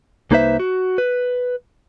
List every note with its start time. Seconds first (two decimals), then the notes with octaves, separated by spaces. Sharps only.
0.31 C2 A#3 D#4 B4 C5 E5
0.60 F#4
0.98 B4